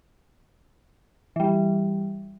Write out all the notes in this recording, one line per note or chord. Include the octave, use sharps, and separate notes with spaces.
E3 G3